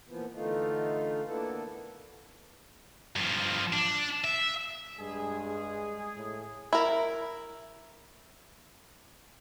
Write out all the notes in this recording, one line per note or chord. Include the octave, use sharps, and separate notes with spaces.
A#2 E3 F3 B3
D3 E3 A3 D#4 F4
A#3 B3 D4 E4 A4
G2 F3
D4
E5
G2 G#3 G#4
A2
E4 A#4